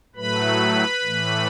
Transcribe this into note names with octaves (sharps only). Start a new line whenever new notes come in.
A2 F#3 A3 B4 B5
A2 E3 A3